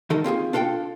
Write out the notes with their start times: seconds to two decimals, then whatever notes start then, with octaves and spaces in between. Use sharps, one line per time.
0.10 D#3 D#4 A4 A#4
0.24 C4 F4 G4 G#4
0.53 D4 F4 A4 F5 G5